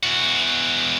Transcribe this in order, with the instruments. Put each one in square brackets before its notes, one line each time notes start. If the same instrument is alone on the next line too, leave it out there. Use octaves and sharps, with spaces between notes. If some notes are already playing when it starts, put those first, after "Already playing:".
[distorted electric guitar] E2 F#4